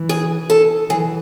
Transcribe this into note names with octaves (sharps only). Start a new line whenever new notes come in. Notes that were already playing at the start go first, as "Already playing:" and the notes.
Already playing: E3
G#4
A4
E3 G#4